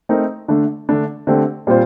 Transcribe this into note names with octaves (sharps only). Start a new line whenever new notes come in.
A3 C4 D#4 A#4
D3 A3 D4
D3 A3 D4
D3 A3 C4 G4
A#2 G3 C4 F4 C5